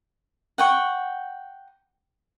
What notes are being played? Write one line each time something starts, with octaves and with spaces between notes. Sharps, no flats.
F#5 G5 C#6